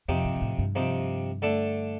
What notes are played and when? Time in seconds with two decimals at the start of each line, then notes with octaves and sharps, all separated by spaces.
0.08 F2 C3 F3 C4 D#4 G4
0.25 G2
0.36 G2
0.42 A2
0.59 G2
0.75 C3 F3 C4 D#4 G4
1.42 D3 A3 D4 A4